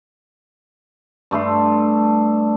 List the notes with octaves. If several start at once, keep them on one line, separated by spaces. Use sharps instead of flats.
G2 A3 A4 C6